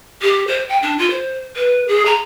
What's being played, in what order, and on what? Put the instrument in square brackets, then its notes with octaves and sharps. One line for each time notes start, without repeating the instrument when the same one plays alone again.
[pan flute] G4
C5
G5
D4
F4
C5
B4
G#4
A#5